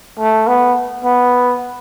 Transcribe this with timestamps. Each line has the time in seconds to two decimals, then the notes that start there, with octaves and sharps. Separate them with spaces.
0.19 A3
0.47 B3
1.04 B3